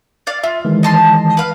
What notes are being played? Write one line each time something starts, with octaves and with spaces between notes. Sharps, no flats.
D5 F5
F4 E5
D#3 E3 G#3
D#5 A5 C6
B4 F5